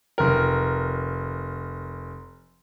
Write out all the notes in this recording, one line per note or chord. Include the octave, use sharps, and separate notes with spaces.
F1 A#4